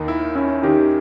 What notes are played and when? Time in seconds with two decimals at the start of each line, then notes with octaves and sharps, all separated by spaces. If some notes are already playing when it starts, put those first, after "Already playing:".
Already playing: D#2 D#3 A#3
0.08 E4
0.35 C#4 E4
0.63 D#3 D#4 G4